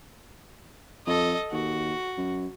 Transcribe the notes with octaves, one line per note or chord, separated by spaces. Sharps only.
F2 A4 D#5
D#2 F#4
F#2